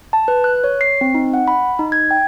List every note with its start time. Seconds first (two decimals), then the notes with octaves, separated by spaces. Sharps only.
0.13 A5
0.28 B4
0.44 F#6
0.64 C#5
0.81 C7
1.01 C4
1.14 D#4
1.34 F#5
1.48 B5
1.79 D#4
1.92 G#6
2.11 G5